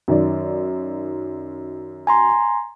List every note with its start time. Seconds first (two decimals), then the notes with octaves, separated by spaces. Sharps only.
0.08 F#2 D#3 D5
2.07 G#5 A#5 C6